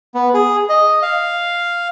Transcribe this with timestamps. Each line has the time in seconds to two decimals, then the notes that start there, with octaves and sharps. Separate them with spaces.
0.15 B3
0.34 G#4
0.69 D#5
1.02 F5